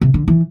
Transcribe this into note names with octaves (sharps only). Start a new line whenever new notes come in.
C3
D3
E3